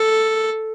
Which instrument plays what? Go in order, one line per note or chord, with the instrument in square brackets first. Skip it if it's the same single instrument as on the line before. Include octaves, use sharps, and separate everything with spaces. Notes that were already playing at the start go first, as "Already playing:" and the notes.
Already playing: [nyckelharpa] A4